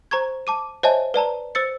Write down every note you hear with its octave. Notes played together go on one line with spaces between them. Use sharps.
C5 A#5 C#6 G#6
A5 D6 D#7
C5 C#5 D#5 E5 G#5 A5
B4 D5 A5 A#5
C5 E6 A6 C#7